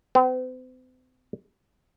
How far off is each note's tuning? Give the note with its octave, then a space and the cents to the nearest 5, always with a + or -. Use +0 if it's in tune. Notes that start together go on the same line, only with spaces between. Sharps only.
C4 -45